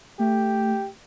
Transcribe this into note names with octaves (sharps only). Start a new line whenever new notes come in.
A3 G4